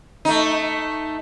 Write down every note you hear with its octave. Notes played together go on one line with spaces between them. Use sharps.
A3 D#4